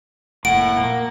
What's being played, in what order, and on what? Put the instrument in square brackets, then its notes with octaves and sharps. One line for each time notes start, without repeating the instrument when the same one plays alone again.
[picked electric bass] F1 A#3 [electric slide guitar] A2 [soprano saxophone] F#5 [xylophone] D7
[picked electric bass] A#2 [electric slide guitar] A#3